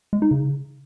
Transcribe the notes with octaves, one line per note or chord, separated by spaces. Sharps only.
G#3
D#4
C#3